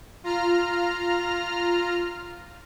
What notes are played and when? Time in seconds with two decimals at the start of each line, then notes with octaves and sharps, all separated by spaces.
0.24 F4 A#5 F6